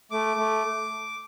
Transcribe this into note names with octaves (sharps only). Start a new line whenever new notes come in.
A3 D6
A3